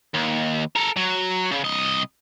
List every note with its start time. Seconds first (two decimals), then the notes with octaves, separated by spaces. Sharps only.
0.14 D#2
0.76 A4 A#4
0.96 F#3
1.51 C#3
1.64 C2 D#5